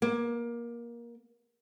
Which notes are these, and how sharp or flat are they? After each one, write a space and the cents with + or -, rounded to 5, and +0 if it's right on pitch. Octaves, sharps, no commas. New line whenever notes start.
A#3 +20